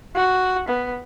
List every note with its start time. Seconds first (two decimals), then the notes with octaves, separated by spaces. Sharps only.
0.16 F#4
0.68 B3